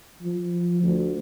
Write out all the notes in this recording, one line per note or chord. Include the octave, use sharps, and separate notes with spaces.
F3
D2